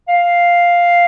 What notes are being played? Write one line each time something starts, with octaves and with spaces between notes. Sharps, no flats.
F5